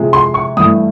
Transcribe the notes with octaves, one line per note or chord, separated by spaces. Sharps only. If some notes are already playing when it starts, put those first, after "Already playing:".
Already playing: C3 F3 G#3
C6
C#6
G2 E3 A3 D#6